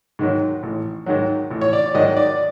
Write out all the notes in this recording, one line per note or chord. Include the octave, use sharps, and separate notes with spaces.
G#2 D#3 F#3
A1
G#2 D#3 F#3
A1
C#5
D5
G#2 D#3 F#3 D#5
D5